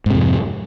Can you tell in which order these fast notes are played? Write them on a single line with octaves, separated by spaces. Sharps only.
G#2 C3 F2